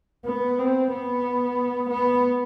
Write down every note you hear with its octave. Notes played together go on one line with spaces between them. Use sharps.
B3
C4
B3
B3